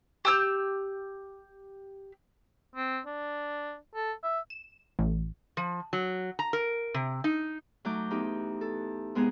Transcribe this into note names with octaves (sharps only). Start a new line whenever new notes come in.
G4 E6 G6
C4
D4
A4
E5
E7
A1
F3
F#3
A#5
A#4
C3
D#4
F#3 A3 D#4 D6 G6
E2 D#4 G4
A4
C3 G#3 B3 D#4 G#4